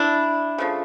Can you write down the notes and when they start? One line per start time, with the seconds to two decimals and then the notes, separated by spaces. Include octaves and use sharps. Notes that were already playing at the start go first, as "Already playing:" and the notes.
Already playing: D4 E4
0.58 C#3 F3 A3